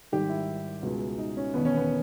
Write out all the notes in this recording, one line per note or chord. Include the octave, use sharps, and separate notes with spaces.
G#1 G#2 D#3 G3 G4
E4
C#2 B2 G#3
D#4
C#4
E1 D#2 D#3 B3
C#4
B3